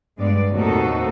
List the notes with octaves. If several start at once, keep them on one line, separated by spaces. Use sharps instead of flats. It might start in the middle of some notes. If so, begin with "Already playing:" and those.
G2 G#3 B3 D5
D#2 A2 C3 D#4 F#4 A4